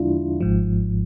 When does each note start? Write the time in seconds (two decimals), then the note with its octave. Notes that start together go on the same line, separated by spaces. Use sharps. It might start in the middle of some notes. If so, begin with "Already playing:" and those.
Already playing: E2 D3 F3 G#3 D4 E4 F4
0.41 G#1 G#2 F3